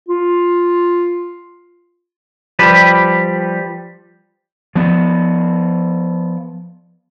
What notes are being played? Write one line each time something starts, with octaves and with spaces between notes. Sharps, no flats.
F4
F3 G3 G4 B4
F3 B3